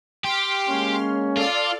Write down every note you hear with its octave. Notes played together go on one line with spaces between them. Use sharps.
G4 C6 F6
G#3 A#3 C#4
F4 A4 D5 F5